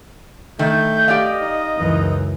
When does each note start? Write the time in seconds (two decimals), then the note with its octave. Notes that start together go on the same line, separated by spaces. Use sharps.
0.59 D#3 A3 G6
1.08 G4 D5 D#5 F5
1.42 D#4
1.78 C#2 F#2 E3